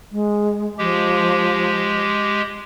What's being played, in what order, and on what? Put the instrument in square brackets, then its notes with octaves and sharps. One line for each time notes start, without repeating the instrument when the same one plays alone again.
[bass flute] G#3
[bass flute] F3 [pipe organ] G#3 G4